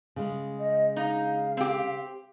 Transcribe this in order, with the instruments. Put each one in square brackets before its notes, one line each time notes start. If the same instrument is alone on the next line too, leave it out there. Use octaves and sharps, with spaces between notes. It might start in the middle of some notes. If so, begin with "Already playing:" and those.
[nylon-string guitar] C#3 G#3
[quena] D#5
[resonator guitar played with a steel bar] D#4 [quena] F5
[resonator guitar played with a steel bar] C4 G4